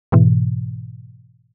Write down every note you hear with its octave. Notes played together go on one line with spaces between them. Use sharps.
G#2 B2 E3